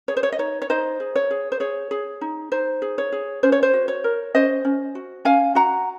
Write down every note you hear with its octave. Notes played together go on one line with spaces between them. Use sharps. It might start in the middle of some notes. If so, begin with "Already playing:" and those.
G#4 C#5
C5
C#5
D#5
D#4 C#5
C#5
D#4 C5 D#5
G#4
C#5
G#4
C5
G#4 C#5
G#4
D#4
D#4 C5
G#4
C#5
G#4
C#4 C5
C#5
C5
F#4
C#5
A#4
C#4 C5 D#5
C#4
F#4
C#4 F5 G#5
F#4 F#5 A#5